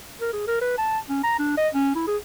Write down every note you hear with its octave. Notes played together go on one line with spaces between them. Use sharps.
A#4
G#4
A#4
B4
A5
C#4
A#5
D4
D#5
C#4
E4
G#4